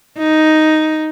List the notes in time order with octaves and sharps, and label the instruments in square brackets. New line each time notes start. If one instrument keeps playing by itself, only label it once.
[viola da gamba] D#4